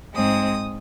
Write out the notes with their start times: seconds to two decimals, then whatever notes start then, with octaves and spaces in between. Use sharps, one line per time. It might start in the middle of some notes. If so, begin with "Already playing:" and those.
0.14 G#2 G#3 C4 D#6